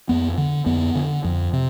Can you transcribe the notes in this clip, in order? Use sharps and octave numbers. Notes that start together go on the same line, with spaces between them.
F2 B3
D3
F2 B3
D3
F2
C3